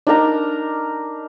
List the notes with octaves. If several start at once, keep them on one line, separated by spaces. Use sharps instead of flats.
D4 D#4 A#4 A#5